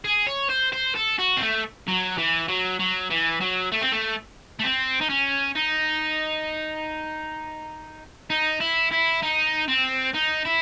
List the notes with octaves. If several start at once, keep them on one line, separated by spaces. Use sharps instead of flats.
G#4
C#5
C5
C5
A4
F#4
C4
A3
F#3
E3
F#3
F#3
E3
F#3
A3
C4
A3
A3
C4
D#4
C#4
D#4
D#4
E4
E4
D#4
C4
D#4
E4